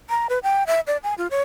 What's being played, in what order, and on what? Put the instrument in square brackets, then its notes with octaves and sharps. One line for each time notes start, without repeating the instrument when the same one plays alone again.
[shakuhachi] A#5
B4
G5
E5
D5
G#5
F4
C#5